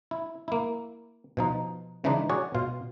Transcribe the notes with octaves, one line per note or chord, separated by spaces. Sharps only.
E4
A#3 E4
B2 F3 D#4
C#3 E3 F3 G#3 D4 D#4
F#4 G#4 C#5 D5 F#5
B2 F4 F5